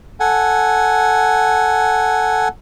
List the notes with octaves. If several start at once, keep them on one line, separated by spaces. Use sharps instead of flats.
A4 F#5 G#5